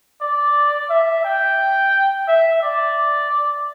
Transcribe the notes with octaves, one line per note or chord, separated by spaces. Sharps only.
D5
E5
G5
E5
D5